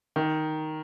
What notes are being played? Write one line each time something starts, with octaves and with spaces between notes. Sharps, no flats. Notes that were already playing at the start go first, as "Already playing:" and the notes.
D#3